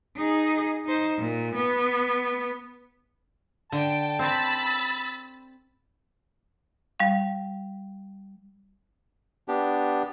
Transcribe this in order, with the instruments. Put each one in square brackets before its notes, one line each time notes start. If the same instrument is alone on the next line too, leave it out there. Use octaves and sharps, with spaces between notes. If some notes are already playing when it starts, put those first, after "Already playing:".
[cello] D#4 G#4
D#4 C5
A#2
B3
[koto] D3 [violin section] G5 [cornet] A5
[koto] C4 [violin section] B5 E6 A6
[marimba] G3 F5
[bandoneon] B3 D4 G4